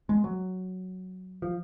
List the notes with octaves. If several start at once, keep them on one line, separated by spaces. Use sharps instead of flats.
G#3
F#3
F3